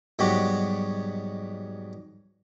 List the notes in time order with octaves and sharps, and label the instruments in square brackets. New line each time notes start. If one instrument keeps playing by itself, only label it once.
[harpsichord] G#2 B2 F#3 G3 F#4 G4